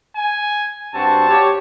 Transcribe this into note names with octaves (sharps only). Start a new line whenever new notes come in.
G#5
G2 C4 F#4 A5
G4 C#5